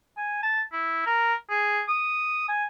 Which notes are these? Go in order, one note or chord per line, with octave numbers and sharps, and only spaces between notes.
G#5
A5
E4
A#4
G#4
D#6
G#5